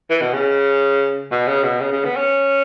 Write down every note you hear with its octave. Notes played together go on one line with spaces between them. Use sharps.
E3
B2
C#3
B2
C#3
B2
C#3
C#3
B3
C#4